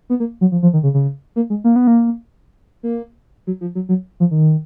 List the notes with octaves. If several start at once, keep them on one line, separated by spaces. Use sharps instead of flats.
B3
A#3
F#3
F3
F3
D#3
C#3
C#3
A#3
G#3
A#3
B3
A#3
A#3
F#3
F3
F#3
F#3
F3
D#3